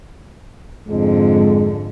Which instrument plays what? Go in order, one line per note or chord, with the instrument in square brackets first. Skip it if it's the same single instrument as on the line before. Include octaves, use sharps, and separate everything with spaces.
[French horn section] F2 G#3 [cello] G#2 D3